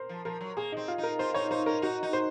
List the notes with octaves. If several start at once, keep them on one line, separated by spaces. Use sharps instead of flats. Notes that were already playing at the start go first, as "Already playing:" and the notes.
Already playing: A#4 C5
F3
F3 A#4
F#3
A#3 G#4
C4 D#4
F4
D#4 A#4
F4 C5
D#4 C#5
D#4 C5
C#4 A#4
D#4 F#4
D#4
C5